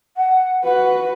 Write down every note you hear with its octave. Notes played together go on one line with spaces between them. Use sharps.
F#5
F#4 B4 F#5